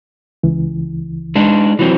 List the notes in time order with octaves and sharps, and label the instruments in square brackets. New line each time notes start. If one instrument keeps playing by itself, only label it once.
[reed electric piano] C#2 E3
[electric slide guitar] G#3 D4 D#4
E3 F#3 C4